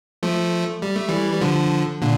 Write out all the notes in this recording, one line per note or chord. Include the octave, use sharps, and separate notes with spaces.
F3 A3
G3
A3
E3 G3
G3
D3 F3
A#2 D3